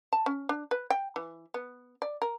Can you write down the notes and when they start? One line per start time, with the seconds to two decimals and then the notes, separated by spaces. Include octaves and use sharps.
0.13 A5
0.26 C#4
0.49 D4
0.71 B4
0.90 G5
1.16 E3
1.54 B3
2.02 D5
2.22 A#4